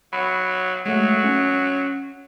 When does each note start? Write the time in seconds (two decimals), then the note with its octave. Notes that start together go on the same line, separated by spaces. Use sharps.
0.13 F#3 B5
0.86 F#3 G#3 A3
1.24 C#4